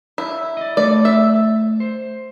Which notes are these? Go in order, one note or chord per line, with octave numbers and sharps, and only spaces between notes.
E4
D5 D#5
A3 D5 B5
E5
C5